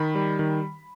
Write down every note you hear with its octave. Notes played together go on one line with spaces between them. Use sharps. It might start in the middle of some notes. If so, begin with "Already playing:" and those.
Already playing: D#3 B5
G3
D#3